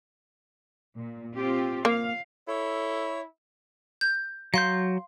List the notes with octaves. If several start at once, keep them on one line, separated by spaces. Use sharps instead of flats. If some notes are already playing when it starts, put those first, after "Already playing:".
A#2
C4 F4 G4
A#3 F5
E4 A4 C#5
G6
F#3 F5 C6 G6